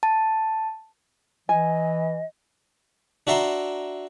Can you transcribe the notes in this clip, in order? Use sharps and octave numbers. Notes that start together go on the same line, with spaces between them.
A5
E3 D#5 G#5
D4 F#4 E5 A#5 C6